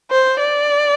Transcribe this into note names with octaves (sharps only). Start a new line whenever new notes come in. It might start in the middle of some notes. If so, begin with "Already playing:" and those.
C5
D5